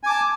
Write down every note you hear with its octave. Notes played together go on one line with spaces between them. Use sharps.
G#5 A5 D6